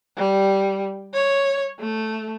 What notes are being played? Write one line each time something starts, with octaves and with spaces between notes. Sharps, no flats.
G3
C#5
A3